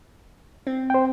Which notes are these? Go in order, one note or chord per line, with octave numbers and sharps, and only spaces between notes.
C4
C5 G5